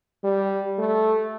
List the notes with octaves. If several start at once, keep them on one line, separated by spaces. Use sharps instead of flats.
G3
A3